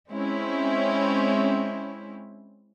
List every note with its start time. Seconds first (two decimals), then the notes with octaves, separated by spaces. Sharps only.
0.10 G#3 C4 C#4 E4